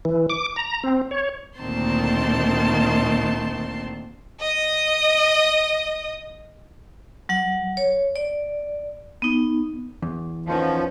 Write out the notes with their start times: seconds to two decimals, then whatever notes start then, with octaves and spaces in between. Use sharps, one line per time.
0.05 E3
0.30 D6
0.56 A#5
0.84 C4
1.11 C#5
1.59 D2 A#2 D#3 C4 A5 C6
4.41 D#5 D#6
7.29 F#3 F#5
7.77 C#5
8.16 D5
9.22 B3 D#4
10.02 E2
10.46 D#3 F3 B3 C#4